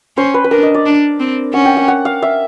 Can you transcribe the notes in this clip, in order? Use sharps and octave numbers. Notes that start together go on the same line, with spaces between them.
C#4 C5
B4
B4
D4 A#4
D#5
D5
D4
C4
C#4 F#5
G5
F#5
F#5
F5
E5